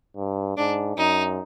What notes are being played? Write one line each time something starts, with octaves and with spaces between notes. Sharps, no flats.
G2
G#2 D4
F#2 D#4